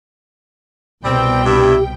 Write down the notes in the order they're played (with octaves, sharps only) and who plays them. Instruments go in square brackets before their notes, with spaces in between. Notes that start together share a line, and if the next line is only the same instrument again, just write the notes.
[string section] C2 B2 G5 [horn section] G3 C4
[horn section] G2 E4 [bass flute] G4